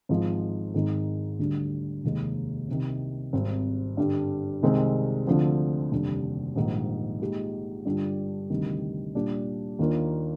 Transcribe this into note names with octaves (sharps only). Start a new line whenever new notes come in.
G#1 G#2 F3 G#3 D#4
G#1 G#2 D#3 G#3 D#4
D2 D3 G3 D4
F1 D#2 D#3 G#3
C2 C3 D#3
G#1 G#2 G3 C4
G2 D3 G3
C2 C3 D#3 G#3 C4
D2 D3 F3 C4
F1 D#2 D3 G3
A#1 G#2 D#3 G3
A#2 G#3 D#4 G4
G2 D3 G3 D4 F4
D2 C3 D#3 G3
A#2 G3 D4 G4
D#2 D#3 A#3 D4 F4